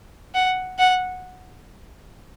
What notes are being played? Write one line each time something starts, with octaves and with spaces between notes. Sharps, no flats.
F#5
F#5